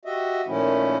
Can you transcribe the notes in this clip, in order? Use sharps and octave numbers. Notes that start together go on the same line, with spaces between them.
F#4 G4 D#5 E5
A#2 D#3 F3 A3 C#4 E4